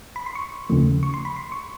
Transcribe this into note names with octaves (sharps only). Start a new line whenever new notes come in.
B5
C6
C#6
D#2 C#3 F3 A3
C#6
C6
B5
C6
C#6